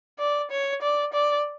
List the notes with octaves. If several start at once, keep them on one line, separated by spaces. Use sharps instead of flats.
D5
C#5
D5
D5